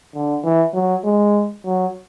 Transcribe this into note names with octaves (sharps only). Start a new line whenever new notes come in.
D3
E3
F#3
G#3
F#3